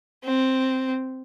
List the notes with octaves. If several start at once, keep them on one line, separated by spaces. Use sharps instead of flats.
C4